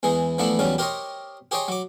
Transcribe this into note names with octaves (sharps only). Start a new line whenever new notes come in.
E2 E3 G#3 G#4
E3 F3 A3 B3 D4 E4
E2 C#3 F#3 G3 C#4
G4 A#4 C5 C#5 D#5
G4 G#4 C5 C#5 D#5 G5
F#3 D6